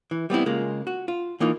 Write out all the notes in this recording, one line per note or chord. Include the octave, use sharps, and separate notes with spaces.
E3
G3 B3 C4 E4
C#3 G#3 A#3 F4
F#4
F4
E3 A#3 D#4 F4